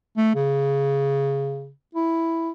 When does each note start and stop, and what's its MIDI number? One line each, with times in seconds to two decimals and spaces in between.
0.17 0.34 57
0.35 1.70 49
1.95 2.50 64